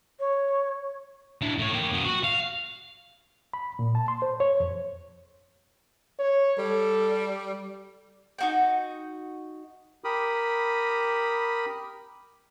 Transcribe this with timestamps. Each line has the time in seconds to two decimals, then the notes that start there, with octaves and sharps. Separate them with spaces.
0.20 C#5
1.42 D4 E4
1.58 A2 C#5
1.73 A#3 G5
1.92 F#2 B3
2.04 F#4
2.24 F5
3.54 B5
3.79 A#2
3.95 A5
4.08 C6
4.22 C5
4.40 C#5
4.60 F2
6.19 C#5
6.58 G3 A4
8.39 D#4 F#4 G5
10.04 G4 A#4 B5 D#6